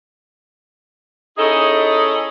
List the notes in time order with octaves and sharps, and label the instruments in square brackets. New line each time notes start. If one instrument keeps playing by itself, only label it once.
[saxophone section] C#4 D#4 E4 G#4 A4 D#5